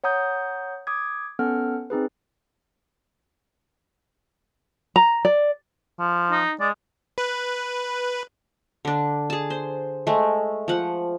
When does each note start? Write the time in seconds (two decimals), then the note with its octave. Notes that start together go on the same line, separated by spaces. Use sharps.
0.04 C#5 F#5 A#5 D#6 G6
0.87 D6 D#6 G#6
1.39 B3 C#4 A4 F#5 F6
1.90 C4 D#4 G#4 B4
4.96 A#5
5.25 D5
5.99 F3
6.31 D#4
6.60 G#3 D5
7.18 B4
8.85 D3 D4
9.30 G#4 A5
9.50 C5
10.07 G#3 A3
10.68 F3 F#5